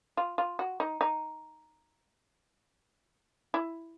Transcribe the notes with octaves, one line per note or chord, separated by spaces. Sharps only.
F4
F4
F#4
D#4
D#4
E4